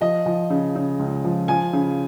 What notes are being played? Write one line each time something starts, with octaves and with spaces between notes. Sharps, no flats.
F3 D#5
F3
C#3
C#3
C#2
F3
F3 G#5
C#3